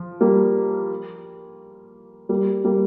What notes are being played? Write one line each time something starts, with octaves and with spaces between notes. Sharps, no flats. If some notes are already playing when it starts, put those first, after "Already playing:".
Already playing: F3
G3 A#3
G3 A#3
G3 A#3